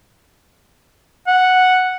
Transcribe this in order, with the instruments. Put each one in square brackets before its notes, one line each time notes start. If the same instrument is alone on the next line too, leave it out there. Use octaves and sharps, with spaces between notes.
[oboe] F#5